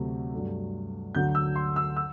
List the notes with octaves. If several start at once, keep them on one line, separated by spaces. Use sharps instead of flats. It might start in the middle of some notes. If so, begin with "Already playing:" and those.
Already playing: D2 C3 F#3 A3
G2 F#3 A3
D2 D3 F#3 G6
E6
C6
E6
E6